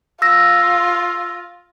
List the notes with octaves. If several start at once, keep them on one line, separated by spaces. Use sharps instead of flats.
F4 E6 A#6